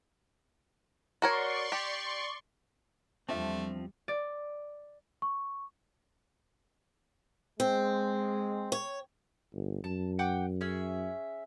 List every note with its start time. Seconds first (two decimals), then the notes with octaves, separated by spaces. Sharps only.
1.22 F#4 A#4 C#5 D5 C6 C#6
1.72 G4
3.29 E2 F3 G3 A3 C4 D4 F4 E5
4.08 D5
5.22 C#6
7.60 G#3 C4
8.72 C#5
9.54 G1
9.84 F#2 A5
10.19 F#5 G5 D6
10.61 C#4 G#4 E5